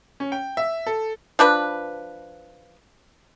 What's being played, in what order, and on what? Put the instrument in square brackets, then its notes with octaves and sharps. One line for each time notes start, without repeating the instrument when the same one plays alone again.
[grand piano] C#4
G5
E5
A4
[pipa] F3 D4 B4